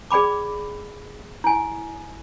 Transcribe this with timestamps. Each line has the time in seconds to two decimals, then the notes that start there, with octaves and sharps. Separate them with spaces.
0.11 G#4 D5 G5 B5 D6
1.44 E4 G#5